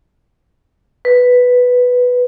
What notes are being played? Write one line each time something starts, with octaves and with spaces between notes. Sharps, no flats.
B4